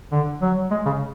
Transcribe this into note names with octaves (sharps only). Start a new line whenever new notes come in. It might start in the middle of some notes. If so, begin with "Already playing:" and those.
D3
F#3
G#3
C#3